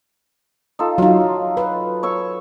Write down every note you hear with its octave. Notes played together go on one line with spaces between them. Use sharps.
D#4 F4 A4
F#3 D#4 F4
B4
C#5 C#6 E6